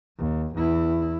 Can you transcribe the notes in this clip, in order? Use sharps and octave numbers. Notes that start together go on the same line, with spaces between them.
D#2
E2 E4